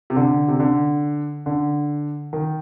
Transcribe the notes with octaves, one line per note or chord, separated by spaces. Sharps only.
C3
D3
C3
D3
D3
D#3